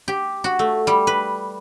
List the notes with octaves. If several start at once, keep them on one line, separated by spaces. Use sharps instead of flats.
G4
F#4
A3
G3
B4